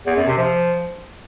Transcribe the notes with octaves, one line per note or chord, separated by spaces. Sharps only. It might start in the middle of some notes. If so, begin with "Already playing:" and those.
E2
F#2
C3
F3